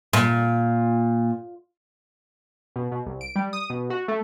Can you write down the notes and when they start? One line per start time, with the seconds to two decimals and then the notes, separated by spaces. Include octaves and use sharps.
0.13 A#2
2.76 B2
2.92 B2
3.06 C2
3.21 D7
3.36 G3
3.53 D#6
3.70 B2
3.90 F#4
4.08 A3